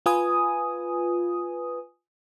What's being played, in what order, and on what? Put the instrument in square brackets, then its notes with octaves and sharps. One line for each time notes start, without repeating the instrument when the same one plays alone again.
[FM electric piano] F4 B4 G#5 D#6